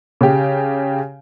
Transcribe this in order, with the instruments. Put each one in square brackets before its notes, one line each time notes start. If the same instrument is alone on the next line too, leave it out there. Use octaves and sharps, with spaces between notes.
[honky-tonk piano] C#3 G4